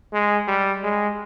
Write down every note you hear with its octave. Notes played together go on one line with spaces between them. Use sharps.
G#3
G3
G#3